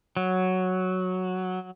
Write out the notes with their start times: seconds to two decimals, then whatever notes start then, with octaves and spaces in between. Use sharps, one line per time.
0.17 F#3